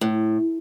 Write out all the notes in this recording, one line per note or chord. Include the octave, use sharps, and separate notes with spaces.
A2